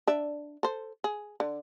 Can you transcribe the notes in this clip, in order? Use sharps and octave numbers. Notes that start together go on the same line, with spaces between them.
D4 D5 E5
A4 C5
G#4
D3